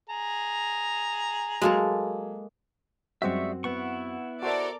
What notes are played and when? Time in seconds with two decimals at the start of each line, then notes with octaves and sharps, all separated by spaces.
0.09 G#4 A#5
1.62 F#3 G#3 A#3 A4
3.22 F#2 G3 G#3 C4 F#4 D5 E5 C#6
3.64 B3 E4 F#5 C#6
4.43 F#4 A4 A#4 C5 D5 E5